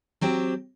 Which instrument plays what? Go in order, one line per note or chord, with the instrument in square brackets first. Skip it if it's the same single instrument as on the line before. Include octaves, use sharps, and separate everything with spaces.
[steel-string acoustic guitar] F#3 C4 G4